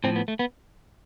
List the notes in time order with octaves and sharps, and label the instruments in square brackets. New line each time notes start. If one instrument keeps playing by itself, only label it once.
[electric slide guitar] A2 F3 C4
B3
A3
B3